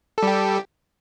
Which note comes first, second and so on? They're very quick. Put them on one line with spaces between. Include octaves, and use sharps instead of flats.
A4 G3 G4